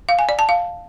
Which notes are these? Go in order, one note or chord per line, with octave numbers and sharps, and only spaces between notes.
F5
G#5
D5
A5
F5